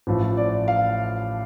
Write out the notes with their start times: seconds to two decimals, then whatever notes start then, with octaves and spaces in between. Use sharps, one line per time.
0.07 A1 A2 F3
0.37 D5
0.68 F5